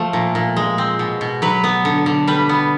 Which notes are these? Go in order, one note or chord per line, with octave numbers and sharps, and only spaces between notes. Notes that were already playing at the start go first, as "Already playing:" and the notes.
Already playing: F3 A3
A#2
A#2
G#3
C4
B2
B2
F#3 B4
B3
D3
D3
G3 B4
B3